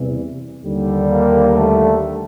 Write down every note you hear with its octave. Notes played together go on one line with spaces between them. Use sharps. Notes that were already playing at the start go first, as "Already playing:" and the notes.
Already playing: E2 C3 E3 G3
D#2 D3 G3
A#3
A3